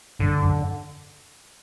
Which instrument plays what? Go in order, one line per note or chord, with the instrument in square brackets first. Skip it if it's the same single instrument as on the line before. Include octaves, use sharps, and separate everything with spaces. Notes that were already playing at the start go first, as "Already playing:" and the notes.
[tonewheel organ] G2 [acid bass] D3
[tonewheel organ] F#2